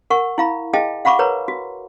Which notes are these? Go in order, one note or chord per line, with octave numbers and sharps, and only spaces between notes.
A#4 F#5 C#6
E4 F5 B5
G#4 D#5 F5 G5 A5
F5 F#5 B5 C#6 D6
A#4 B4 C#5 A#5
F#4